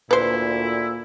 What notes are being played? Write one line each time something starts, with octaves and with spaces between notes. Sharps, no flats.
D2 A#2 E4 B4 C5